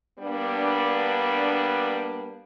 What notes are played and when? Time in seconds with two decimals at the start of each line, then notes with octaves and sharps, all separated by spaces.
0.20 G3 A#3 B3 D4